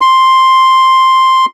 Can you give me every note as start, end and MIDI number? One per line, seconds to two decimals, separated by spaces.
0.01 1.45 84